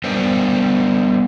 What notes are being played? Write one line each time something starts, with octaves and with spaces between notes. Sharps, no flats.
G3 B3 D4 A#4 C5 D#5